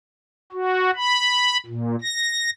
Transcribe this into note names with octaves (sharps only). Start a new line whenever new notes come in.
F#4
B5
A#2
A#6